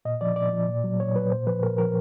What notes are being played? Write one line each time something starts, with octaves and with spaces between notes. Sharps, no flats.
A#2 D#5
F3 D5
A#2 D5
F3
A#2
F#3
A#2 C#5
F#3 B4
A#2 C5
F3 B4
A#2 A#4
F3 A#4